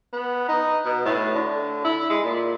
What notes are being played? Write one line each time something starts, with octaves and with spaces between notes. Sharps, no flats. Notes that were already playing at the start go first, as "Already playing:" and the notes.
B3
D#4
B2
A2
D3
E4
G#3
A#2